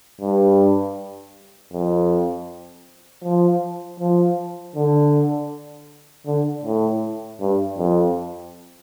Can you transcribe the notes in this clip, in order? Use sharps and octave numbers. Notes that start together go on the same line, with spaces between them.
G2
F2
F3
F3
D3
D3
A2
G2
F2